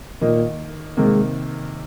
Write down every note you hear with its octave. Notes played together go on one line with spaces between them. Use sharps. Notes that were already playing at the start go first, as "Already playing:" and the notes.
A#2 D#3 A#3 D#4
C3 D#3 G#3 A#3